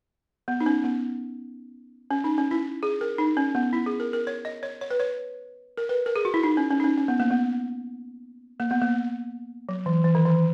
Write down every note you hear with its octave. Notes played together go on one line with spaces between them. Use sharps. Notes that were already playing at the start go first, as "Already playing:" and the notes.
B3
D#4
C#4
B3
C#4
D#4
C#4
E4
G#4
A#4
D#4
C#4
B3
E4
G#4
A#4
A#4
C#5
D#5
C#5
C#5
B4
C#5
A#4
B4
A#4
G#4
F#4
E4
D#4
C#4
C#4
D#4
C#4
C#4
B3
A#3
B3
A#3
B3
A#3
F#3
E3
E3
D#3
E3